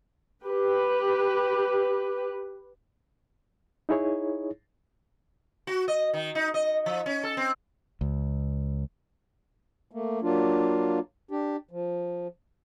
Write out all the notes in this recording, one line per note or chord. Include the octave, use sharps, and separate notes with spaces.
G4 B4
D#4 E4 G#4 C#5
F#4
D#5
D#3
D#4
D#5
F3
C#4
A4
C4
C#2
A3 A#3
F#3 A#3 D4 F4
D4 G4
F3